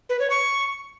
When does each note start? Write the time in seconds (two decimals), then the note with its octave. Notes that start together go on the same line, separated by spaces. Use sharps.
0.09 B4
0.20 C#5
0.30 C#6